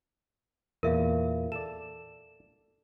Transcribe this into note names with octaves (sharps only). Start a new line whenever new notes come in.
E2 A#2 A#4 E5 F5
A4 D5 E7